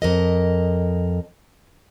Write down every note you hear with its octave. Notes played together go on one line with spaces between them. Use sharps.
F2 A#4 D#5